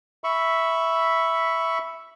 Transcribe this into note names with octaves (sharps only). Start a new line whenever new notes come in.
E5 B5 C#6